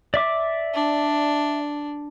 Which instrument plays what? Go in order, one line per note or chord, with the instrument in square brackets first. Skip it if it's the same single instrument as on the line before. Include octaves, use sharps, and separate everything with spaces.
[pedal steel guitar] D5 E5 D6
[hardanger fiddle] D4